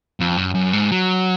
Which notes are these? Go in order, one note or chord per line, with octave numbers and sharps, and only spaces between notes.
F2
F#2
F#2
G#2
F#3